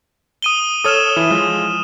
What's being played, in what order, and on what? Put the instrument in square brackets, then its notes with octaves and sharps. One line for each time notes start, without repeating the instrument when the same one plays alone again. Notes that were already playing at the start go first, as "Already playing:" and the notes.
[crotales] D#6 D#7 G7
[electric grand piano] A4 C#5 [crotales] D#6 F6 E7
[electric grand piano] E3 E4
F3 G#3